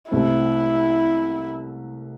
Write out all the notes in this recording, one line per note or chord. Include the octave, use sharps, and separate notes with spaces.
C2 C3 A3 C4 E4